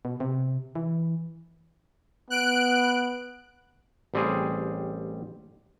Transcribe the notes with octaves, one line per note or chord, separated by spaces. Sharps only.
B2
C3
E3
B3 F#6 D7
A1 G3 C4 G#4